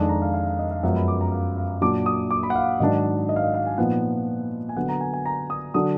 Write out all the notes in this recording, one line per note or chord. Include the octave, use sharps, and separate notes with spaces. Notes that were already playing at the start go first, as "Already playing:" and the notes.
Already playing: F2 D#3 G#3 D4
A#5
F5
F5
F5
D#5
F5
F#2 F3 G#3 B3 F#5
B5
D6
A#5
F5
F5
A#2 F#3 D4 D6
D#6
D6
B5
F#5
F5
G#2 D#3 F#3 D4 D#5
D#5
F5
D#5
F5
G#5
A#2 F3 B3 D#4 F#5
G#5
D3 F#3 B3 F#5
A#5
G#5
G#5
A#5
D#6
D3 F#3 D4 D#6